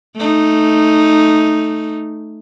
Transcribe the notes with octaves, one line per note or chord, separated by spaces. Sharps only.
A3 D#4